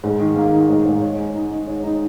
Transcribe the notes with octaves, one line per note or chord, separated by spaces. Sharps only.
G#2
D#3
A#3
D#4
G#2
G#2
C#5
G#3
D#4
D#4
C#5
D#4